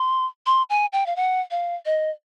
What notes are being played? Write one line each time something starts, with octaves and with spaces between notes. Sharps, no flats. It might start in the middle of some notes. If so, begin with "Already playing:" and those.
Already playing: C6
C6
G#5
G5
F5
F#5
F5
D#5